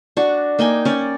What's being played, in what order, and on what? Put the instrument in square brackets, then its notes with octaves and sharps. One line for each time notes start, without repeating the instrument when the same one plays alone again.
[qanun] D4 F#4 C#6
A#3 D#4 G5 G#5
C#4 C#5 D5